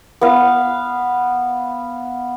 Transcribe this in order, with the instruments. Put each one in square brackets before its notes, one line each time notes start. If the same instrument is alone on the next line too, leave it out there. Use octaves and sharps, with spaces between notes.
[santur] B3 F5